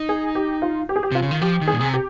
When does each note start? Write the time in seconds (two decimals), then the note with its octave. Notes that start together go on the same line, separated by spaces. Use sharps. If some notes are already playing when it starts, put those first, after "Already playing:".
Already playing: D#4
0.09 G#4
0.35 G4
0.62 F4
0.89 G4
0.96 G#4
1.03 G4
1.12 C3 F4
1.22 C#3
1.31 D#3
1.41 F3 G4
1.62 D#3
1.68 A#2 G#4
1.81 C3
1.94 G4